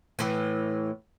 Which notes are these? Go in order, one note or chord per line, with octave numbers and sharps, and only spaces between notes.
A2 E3